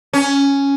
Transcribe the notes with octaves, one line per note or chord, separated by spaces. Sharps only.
C#4